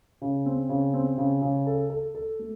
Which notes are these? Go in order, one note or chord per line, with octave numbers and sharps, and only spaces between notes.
C#3
C4
C#3
C4
C#3
C#3
A4
A4
A4
A3